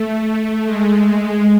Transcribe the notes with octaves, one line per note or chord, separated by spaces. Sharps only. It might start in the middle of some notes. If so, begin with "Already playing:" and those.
Already playing: A3
G#3
G#3